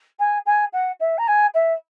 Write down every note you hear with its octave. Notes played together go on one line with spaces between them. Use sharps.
G#5
G#5
F#5
E5
A#5
G#5
E5